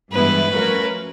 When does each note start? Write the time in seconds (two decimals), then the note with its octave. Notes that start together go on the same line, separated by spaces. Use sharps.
0.12 G2 E3 G#3 B3 E4 B4
0.51 F3 A3 C#4 F#4 A#4